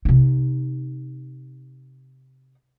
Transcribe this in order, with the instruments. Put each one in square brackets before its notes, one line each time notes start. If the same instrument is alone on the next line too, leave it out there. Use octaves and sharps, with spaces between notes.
[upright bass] C3 D#4